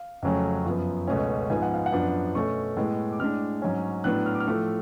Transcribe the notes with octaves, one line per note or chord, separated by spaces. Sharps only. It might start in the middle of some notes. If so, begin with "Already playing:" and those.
Already playing: F5
F2 C#3 F#3 A3 C#4
F#2 F3 B3
C#2 B2 A3 C#4
G#2 F3 B3 G#5
F#5
F5
F#5
F#2 F3 B3 D4
B2 A3 C#4 C#6
A2 G#3 B3
D6
A2 G#3 D4 F6
G#2 F#3 C#4
A2 F#3 B3 D4 F#6
F6
D6
F6
A2 F3 A3